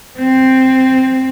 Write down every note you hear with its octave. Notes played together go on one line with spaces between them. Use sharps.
C4